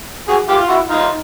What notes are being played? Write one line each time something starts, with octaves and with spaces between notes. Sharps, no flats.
F#4 G#4
F4 G4
F4
E4 F#4
D#4 F4